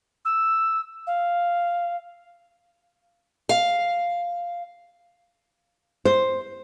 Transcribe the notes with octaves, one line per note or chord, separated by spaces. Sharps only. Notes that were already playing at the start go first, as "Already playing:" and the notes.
E6
F5
F5
C5